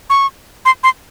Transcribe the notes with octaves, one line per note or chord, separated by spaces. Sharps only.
C#6
C6
C6